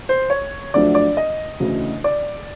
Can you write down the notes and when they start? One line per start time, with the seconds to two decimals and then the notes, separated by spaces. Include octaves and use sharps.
0.09 C5
0.30 C#5
0.74 F2 D3 F#3 A3 D4 D5
0.95 D5
1.17 D#5
1.60 D2 C#3 E3 A3 D4
2.04 D5